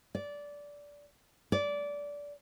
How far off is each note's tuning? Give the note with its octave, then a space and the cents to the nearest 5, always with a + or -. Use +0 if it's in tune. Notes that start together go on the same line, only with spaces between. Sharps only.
D5 -15
D5 -20